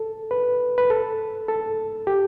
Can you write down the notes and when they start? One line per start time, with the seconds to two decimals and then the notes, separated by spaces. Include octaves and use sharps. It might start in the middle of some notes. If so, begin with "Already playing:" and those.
Already playing: A4
0.31 B4
0.78 B4
0.90 A4
1.48 A4
2.07 G4